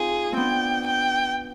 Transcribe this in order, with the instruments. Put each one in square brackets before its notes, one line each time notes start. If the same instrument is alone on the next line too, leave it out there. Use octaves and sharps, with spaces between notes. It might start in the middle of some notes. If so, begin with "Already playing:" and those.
Already playing: [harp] C4 D#4 F4 [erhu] G#4
[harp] B3 C4 D4 [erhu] G5
[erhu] G5